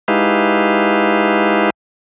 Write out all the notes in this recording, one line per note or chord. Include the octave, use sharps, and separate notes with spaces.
G#3 D#4 E4 G4 B4 F5